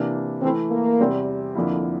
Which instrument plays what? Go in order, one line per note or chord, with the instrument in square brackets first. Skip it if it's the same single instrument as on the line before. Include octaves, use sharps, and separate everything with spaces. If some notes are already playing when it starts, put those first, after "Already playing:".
Already playing: [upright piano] C3 E3 A#3 D4
[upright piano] E3 A3 E4 [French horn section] C4
[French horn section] A#3
[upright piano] E2 C3 G3 C4
F2 D3 F3 A#3 E4